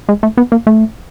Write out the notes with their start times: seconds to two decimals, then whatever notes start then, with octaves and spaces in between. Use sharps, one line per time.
0.09 G#3
0.23 A3
0.37 B3
0.52 A#3
0.67 A3